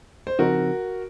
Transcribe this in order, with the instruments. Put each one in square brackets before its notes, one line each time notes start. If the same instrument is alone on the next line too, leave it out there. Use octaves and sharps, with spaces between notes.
[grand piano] C5
[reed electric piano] C#3 F3 C4 D#4 [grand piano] F#4 A#4